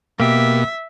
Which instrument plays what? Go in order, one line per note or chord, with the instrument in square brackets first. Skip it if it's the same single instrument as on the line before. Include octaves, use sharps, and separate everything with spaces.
[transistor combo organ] B2 [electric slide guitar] A#3 G4 [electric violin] E5